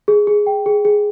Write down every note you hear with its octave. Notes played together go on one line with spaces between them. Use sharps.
G#4
G#4
G5
G#4
G#4